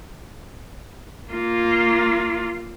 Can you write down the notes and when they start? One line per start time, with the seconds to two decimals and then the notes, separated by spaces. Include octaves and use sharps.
1.32 A#3 F4